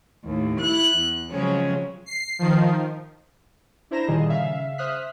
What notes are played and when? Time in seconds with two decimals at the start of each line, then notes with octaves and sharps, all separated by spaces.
0.24 D#2 A2
0.60 E4 F#6
0.97 E2
1.29 C#3 F3 F#3 G#3 C4 C#4
2.06 C7
2.39 D#3 F3
3.91 D4 E4 C5 A#5 A#6 E7
4.08 A#2 D3 D#3 G3 G#4 D#5
4.30 C#3 E5 F5
4.78 C5 E5 D#6 F6 F#6 B6